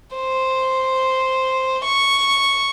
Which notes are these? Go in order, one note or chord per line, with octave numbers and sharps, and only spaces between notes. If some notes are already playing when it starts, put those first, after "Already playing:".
C5
C#6